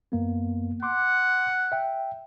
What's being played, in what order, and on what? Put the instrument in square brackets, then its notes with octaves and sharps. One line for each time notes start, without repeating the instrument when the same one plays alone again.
[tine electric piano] F#2 A#3 B3
[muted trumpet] F#5 [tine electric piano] C6 D6
[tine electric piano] E5 G5